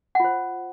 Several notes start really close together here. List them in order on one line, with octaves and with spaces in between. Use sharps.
F#5 F4 C5